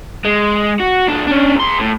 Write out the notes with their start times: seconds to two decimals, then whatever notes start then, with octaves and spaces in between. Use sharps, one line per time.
0.25 G#3
0.80 F#4
1.08 C2 D4
1.27 C#4 D4
1.56 E2 C6
1.80 A2